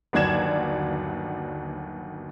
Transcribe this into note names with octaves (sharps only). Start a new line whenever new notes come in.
G1 D#2 F#3 D5 G#6 E7